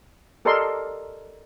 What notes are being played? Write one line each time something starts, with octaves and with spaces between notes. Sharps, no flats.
G4 A4 A#4 D5 D#5 C6